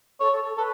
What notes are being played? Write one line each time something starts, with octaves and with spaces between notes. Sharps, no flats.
A4 C#5
A4
A4
A4 B4